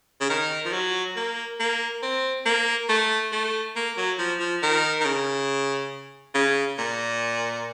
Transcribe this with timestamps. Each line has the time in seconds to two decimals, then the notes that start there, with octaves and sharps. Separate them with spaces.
0.21 C#3
0.30 D#3
0.65 F3
0.73 F#3
1.16 A#3
1.60 A#3
2.03 C4
2.46 A#3
2.89 A3
3.32 A3
3.76 A#3
3.97 F#3
4.19 F3
4.40 F3
4.63 D#3
5.00 D#3
5.05 C#3
6.35 C#3
6.78 A#2